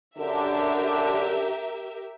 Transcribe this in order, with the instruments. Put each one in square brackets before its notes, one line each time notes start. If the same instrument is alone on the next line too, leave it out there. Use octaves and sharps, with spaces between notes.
[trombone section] F#2 D3 D4 [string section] G4 A#4 E5